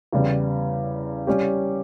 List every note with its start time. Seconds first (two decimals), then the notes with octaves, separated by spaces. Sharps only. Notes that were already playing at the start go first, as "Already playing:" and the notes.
0.13 E2 C#3 G3
1.27 G3 C#4 G4